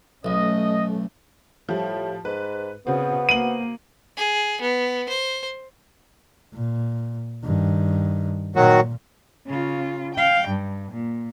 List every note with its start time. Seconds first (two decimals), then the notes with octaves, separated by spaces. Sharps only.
0.25 B1 A3 C#4 D#5
1.69 A2 F3 G3
2.25 G#2 B4
2.87 C#3 B3 C4 F#4
3.29 A#3 D#7 F#7
4.17 G#4
4.61 B3
5.09 C5
6.54 A#2
7.44 G2 D#3
8.56 A#2 D#3 F#3 F#4
9.46 C#3 F4
10.15 F5 G5
10.48 G2
10.92 A#2